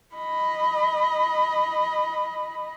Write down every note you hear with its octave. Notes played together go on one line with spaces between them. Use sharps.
D#5 B5